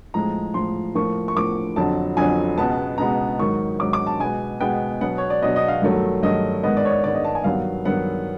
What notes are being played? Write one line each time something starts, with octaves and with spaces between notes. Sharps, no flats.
A2 F3 G#3 A#5
A2 F3 G#3 C6
A2 F3 A#3 C#6
C#6
A2 F3 A#3 D6
F2 D3 F#3 A5
F2 D3 F#3 G#5
C#2 B2 G#3 B3 A5
C#2 B2 G#3 B3 A#5
G#2 D#3 F#3 C#6
G#2 D#3 F#3 D6
D6
A5
B2 G#3 B3 G#5
B2 G#3 B3 G5
B2 F#3 B3 F#5
C#5
D5
B2 F#3 B3 D#5
D#5
F5
G2 D#3 F#3 A3
G2 D#3 F#3 A3 D#5
G#2 D#3 G#3 B3 D#5
D5
C#5
D5
G#2 D#3 G#3 B3 D5
D#5
A5
G#5
G2 D#3 F#3 B3 F5
G2 D#3 F#3 B3 F#5